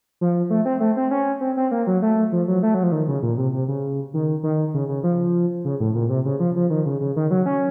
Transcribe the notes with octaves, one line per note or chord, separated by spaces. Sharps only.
F3
A3
C4
A3
C4
C#4
C4
C4
A#3
F#3
A3
F3
F#3
A3
F#3
F3
D#3
C#3
A#2
C3
C3
C#3
D#3
D#3
C#3
C#3
F3
C#3
A2
A#2
C3
C#3
F3
F3
D#3
C#3
C#3
D#3
F#3
C#4